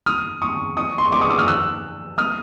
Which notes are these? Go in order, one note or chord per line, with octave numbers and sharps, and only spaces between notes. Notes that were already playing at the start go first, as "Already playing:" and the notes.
D#6 F6
C#6 D#6
C#6 D#6
C6
C#6
C6 D6
C#6 D#6
D6 E6
D#6 F6
E6 F#6
D#6 F6